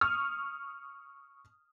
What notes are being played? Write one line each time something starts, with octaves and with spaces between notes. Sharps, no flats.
C#6 D#6 F6